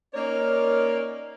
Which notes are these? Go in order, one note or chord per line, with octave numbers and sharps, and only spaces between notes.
A#3 C#4 D#4 A#4 C#5 D5